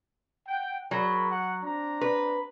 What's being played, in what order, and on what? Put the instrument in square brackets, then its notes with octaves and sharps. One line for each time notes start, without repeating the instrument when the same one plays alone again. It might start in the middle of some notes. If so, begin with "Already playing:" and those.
[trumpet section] F#5 G5
[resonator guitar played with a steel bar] F#3 [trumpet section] G#4 A#4 B5
[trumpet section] F#5
C4 D4 A#5
[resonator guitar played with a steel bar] B4